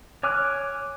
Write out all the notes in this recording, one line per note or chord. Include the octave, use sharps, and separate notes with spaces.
C#5 G#5 D6 F6 F#6